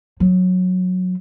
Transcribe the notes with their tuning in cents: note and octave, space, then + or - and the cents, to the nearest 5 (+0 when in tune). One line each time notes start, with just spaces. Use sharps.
F#3 -15